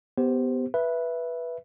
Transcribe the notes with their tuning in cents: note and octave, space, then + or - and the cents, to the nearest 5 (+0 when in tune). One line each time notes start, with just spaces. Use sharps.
B3 +15 G4 +0 C5 +0
B4 -10 E5 +10